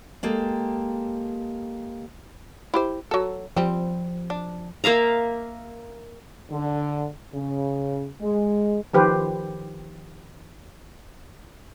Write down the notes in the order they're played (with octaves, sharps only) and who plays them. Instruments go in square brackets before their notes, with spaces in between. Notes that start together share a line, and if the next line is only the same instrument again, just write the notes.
[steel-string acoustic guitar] G#3 A#3 G4 A4
[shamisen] E4 G4 C5
F#3 A4
[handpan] F3 [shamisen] G3 C4
[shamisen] D4
[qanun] A#3 E5 F5 A#5
[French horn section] D3
C#3
G#3
[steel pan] D#3 F3 G4 B4 C5